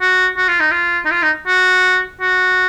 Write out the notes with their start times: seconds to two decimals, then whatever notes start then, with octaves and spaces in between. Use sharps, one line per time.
0.01 F#4
0.37 F#4
0.49 F4
0.60 D#4
0.71 F4
1.06 D#4
1.11 F4
1.23 D#4
1.47 F#4
2.21 F#4